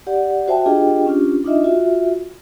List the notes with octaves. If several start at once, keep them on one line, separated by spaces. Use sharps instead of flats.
G4 D5 F#5
F#4 C5 E5 G5 A5
D4 F4 G4 G#4 D#5 G5
C#4 D4 F4 G4
D4 D#4 F4 D#5 E5
F4 F#4 E5